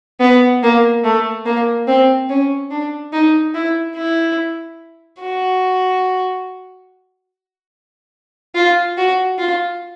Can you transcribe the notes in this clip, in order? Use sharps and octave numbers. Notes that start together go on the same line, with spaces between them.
B3
A#3
A3
A#3
C4
C#4
D4
D#4
E4
E4
F#4
F4
F#4
F4